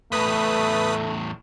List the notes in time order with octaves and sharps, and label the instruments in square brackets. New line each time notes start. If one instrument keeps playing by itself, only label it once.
[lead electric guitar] E2 A2 [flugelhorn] A3 [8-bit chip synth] B4 D#6 B6